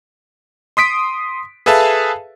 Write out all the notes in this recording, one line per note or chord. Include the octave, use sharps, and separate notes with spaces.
C6 D#6 B6 D7
G#4 A4 B4 E5 F5 A5